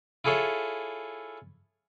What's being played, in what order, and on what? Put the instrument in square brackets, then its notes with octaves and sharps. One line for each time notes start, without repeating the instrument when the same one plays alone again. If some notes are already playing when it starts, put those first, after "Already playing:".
[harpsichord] E4 F4 G#4 A4 C#5 E5